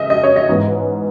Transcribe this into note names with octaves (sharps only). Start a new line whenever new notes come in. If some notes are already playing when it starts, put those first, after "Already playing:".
Already playing: C#3 D#5 E5
D#5
C#5
D#5
G#2 E3 B3